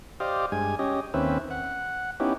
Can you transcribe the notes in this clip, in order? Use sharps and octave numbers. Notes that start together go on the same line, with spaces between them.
G4 C5 D5 D#5 F5
G2 G#3 G#5
C#4 G4 D#5
D#2 C4 C#4 B4 E5
F#5
B3 C#4 D#4 E4 G4